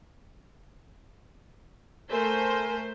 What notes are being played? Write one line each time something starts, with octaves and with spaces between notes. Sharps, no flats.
A3 A#4 C5 G#5